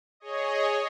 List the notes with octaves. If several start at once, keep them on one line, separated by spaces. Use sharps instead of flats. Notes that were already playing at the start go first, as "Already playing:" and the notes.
G#4 C#5 D#5